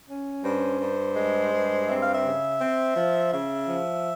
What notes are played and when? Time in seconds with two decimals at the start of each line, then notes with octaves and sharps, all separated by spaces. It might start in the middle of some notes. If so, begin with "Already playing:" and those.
0.08 C#4
0.44 G2 C5
0.80 G2
1.16 G#3
1.52 G2
1.88 C4 E5
2.00 F5
2.12 E5
2.24 C#3
2.60 C4
2.95 F3
3.32 C#3 E5
3.68 F3